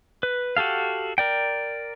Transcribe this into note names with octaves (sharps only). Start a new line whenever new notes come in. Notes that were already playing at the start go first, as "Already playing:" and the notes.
B4
F#4 G4 A4 F5
A#4 D5 G5